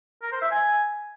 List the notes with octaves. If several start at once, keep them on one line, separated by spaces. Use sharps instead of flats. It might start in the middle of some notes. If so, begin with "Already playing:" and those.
A#4
C5
E5
G#5